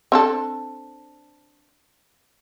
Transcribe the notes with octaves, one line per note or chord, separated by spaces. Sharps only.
C4 D4 A4